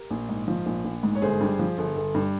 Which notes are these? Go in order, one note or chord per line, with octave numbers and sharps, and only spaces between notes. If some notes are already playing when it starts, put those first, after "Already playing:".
Already playing: G4 A#4
A#1
G#2
F3
A#1
A#1
G#2
C#5
G1 G#4 C5
G2
F3
G1
G1
G2